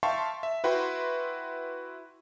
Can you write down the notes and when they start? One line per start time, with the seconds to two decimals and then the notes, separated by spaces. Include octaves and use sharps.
0.03 E5 F5 G5 A5 C6 C#6
0.43 E5
0.64 E4 F#4 B4 E5 G5 C6